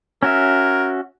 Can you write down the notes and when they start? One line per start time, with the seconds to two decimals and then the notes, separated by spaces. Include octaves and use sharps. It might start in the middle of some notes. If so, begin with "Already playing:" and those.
0.23 C#4 F#4 A#4 E5